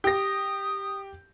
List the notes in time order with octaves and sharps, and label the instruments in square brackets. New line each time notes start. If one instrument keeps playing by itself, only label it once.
[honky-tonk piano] G4 A#6 [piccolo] D#6